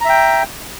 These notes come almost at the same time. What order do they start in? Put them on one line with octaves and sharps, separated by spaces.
A#5 E5 G5